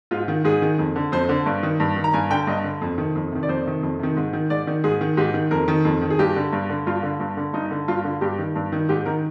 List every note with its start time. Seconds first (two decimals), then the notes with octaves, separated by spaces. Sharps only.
0.11 G#2 F4
0.28 D#3
0.44 G#2 G#4
0.62 D#3
0.79 F2
0.96 D3
1.12 F2 C5
1.29 D3
1.46 G2
1.63 D#3
1.80 G2
1.96 D#3
2.04 A#5
2.14 G2 G#5
2.30 D3 G5
2.47 G2 D#5
2.64 D3
2.81 F2
2.98 C3 D#3
3.15 F2
3.32 C3 D#3
3.43 D5
3.49 F2 C5
3.66 C3 D#3
3.83 F2
3.99 C3 D#3
4.17 G#2
4.33 D#3
4.50 G#2 D5
4.67 D#3
4.84 G#2 G#4
5.01 D#3
5.17 G#2 G4
5.34 D#3
5.51 F2 A#4
5.68 D#3
5.85 F2
6.02 D#3
6.10 G#4
6.19 G2 G4
6.36 D3
6.53 G2
6.69 D3
6.87 G2 F4
7.03 D3
7.20 G2
7.37 D3
7.53 G2 D#4
7.71 D3
7.88 G2 F4
8.04 D3
8.21 G2 G4
8.39 D#3
8.55 G2
8.72 D#3
8.89 G#2 G4
9.06 D#3 A#4